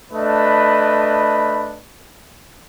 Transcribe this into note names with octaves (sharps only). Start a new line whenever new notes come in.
A3 D4 B4 D#5 B5